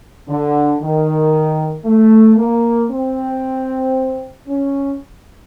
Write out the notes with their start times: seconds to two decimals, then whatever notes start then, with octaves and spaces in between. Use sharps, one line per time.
0.28 D3
0.80 D#3
1.85 A3
2.37 A#3
2.90 C4
4.47 C#4